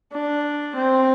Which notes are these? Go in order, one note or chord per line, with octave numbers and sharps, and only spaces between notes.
D4
C4